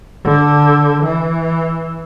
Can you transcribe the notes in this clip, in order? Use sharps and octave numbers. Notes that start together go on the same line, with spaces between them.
D3
E3